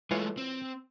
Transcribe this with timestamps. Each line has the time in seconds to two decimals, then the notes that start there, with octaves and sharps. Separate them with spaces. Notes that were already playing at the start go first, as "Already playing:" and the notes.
0.11 E3 G#3 A3 F4 C#5
0.37 C4